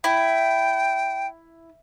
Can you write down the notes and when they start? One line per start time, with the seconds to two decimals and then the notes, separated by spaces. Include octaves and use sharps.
0.04 E4 G5